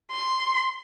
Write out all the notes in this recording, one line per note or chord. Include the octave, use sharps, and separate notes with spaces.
C6